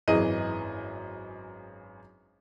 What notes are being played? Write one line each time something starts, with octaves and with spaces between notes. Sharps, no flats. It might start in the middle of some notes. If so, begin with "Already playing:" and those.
G#1 F#2 E3 G#4 D#5 D#7